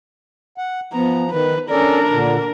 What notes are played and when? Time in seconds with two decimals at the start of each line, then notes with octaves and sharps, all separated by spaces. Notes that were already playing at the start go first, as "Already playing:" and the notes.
0.58 F#5
0.93 F3 B3 A#5
1.32 D#3 B4
1.70 C#4 D4 A4 A#4 D5
2.11 A#2 D3